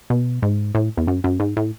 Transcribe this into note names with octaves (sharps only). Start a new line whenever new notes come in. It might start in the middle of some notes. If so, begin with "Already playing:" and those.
B2
G#2
A2
E2
F#2
F#2
G#2
A2